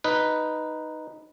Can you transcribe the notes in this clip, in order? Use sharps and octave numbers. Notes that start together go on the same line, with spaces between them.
D#4 B4